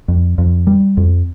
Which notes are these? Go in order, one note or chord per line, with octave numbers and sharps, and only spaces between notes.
F2
F2
G3
F2